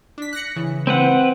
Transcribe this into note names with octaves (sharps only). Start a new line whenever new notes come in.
D4 B6
F#6 A#6 C#7
C#3 E3
C4 B4 F#5